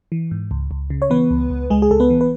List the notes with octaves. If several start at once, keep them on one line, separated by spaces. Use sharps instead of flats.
E3
G#2
C#2
C#2
C#3
C#5
E3 B3 B4
C#2
C#2
C#2 G#3 G#4
G#4
C#2 A4
B3 B4
E3
B4